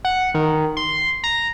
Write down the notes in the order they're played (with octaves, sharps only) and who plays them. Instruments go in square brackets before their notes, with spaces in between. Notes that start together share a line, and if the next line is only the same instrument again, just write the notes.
[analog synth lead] F#5
D#3
C6
A#5